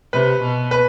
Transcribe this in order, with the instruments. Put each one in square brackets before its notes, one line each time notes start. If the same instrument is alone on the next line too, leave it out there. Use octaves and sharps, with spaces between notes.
[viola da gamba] C3 [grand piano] B4
[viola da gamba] B2
[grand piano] B4